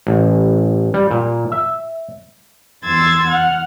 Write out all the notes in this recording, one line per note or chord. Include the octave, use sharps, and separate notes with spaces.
A1
G3
A#2
E5
E2 C6 E6 G#6 A6
F#5 F6